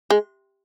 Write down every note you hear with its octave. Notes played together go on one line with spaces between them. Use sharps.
G#3